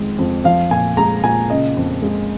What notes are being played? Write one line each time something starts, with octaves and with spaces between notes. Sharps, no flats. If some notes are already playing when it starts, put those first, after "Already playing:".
Already playing: F2 D#3 G#3
F2
F3 F5
A#2 G#5
G#3 A#5
A#2 G#5
C#3 D#5
F2
G#3